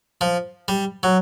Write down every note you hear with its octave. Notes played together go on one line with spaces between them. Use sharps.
F3
G3
F#3